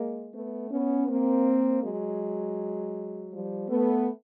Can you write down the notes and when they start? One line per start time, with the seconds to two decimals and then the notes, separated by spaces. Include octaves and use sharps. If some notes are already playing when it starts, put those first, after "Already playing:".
Already playing: G#3 A#3
0.33 A3 B3
0.71 B3 C#4
1.08 A#3 C4
1.82 F#3 G#3
3.31 F3 G3
3.69 A3 B3